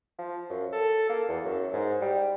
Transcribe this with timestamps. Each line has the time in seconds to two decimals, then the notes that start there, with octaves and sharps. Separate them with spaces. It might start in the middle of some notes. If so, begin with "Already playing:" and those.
0.19 F3
0.50 F#2
0.72 A4
1.09 A#3
1.28 E2
1.44 F#2
1.73 G#2
2.01 G3